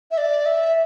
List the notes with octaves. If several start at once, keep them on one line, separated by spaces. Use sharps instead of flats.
E5
D5
E5